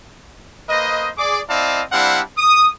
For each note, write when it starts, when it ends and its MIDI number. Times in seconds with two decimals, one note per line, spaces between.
0.69 1.10 58
0.69 1.10 71
0.69 1.10 72
0.69 1.10 75
1.18 1.41 68
1.18 1.41 74
1.18 1.41 86
1.49 1.83 60
1.49 1.83 64
1.49 1.83 74
1.49 1.83 75
1.49 1.83 77
1.49 1.83 81
1.92 2.21 55
1.92 2.21 60
1.92 2.21 62
1.92 2.21 64
1.92 2.21 77
1.92 2.21 78
2.37 2.70 87